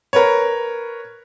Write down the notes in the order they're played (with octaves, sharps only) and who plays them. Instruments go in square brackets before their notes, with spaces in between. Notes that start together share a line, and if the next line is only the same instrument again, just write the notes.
[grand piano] A#4 B4 C#5